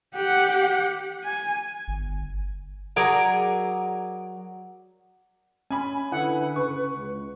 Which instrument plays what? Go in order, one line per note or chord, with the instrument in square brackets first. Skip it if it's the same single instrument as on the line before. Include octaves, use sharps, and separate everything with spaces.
[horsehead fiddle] G4 F#5
G#5
[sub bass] G1
[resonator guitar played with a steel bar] F#3 G#4 A#4 D5 A#5
[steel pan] C#4 [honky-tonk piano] G#5 B5
[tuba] D3 [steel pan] E4 F#5 [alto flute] B4
[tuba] C#3 [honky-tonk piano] C#6
[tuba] C#2